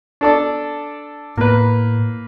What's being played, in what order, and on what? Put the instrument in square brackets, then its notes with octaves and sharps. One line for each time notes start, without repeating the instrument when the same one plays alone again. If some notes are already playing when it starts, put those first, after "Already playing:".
[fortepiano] D4 A4 D5
[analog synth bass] A2 [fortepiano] A#3 B4